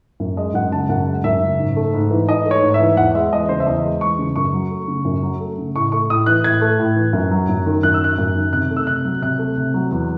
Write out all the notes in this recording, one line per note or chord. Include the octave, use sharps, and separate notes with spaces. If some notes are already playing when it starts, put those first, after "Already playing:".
F#2
G#3 D#5
F#2 F#5
C#3 A5
F#2 F#5
G#3
F#2 E5
C#3
G#2
A3
G#2
E3
G#2 D#5
A3
C#5
G#2
E5
E3
E2 F#5
G#3 E5
E2 D#5
C#3 C5
E5
E2 D#5
G#3
E2 C#6
C#3
F#2 C#6
F#3
A3
C#3
F#2
F#3
A3
C#3
A2 C#6
A3 C#6
A2 D#6
E3 F#6
A2 G#6
A3
A2
E3
F#2
F#3
F#2
D#3
F#2 F#6
E6
F#3 F#6
F#2
D#3
C3 F#6
A3
E6
C3 F#6
F#3
C3 F#6
A3
C3
F#3
E2